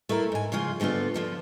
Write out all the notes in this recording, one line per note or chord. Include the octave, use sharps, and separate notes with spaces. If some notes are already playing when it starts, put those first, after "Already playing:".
A3 E4 F4 A#4
G#2 G#5
C#3 F3 G#3 F4 G#4
G#2 D3 A3 B3 F4
D3 F3 B3